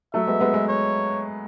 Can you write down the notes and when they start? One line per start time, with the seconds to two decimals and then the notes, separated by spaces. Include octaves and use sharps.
0.14 F#3 A3 E5
0.27 G#3 B3
0.40 G#3 B3
0.54 G#3 B3
0.68 C#5